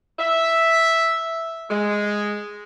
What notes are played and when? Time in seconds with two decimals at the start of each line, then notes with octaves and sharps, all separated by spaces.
0.20 E5
1.70 G#3